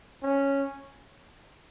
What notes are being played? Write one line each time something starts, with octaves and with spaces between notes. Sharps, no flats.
C#4